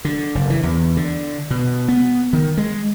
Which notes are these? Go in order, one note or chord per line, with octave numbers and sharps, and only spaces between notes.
D3
F#1
E3
E2
D3
B2
B3
D#3
G#3